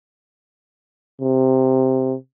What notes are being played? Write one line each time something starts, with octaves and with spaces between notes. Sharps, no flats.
C3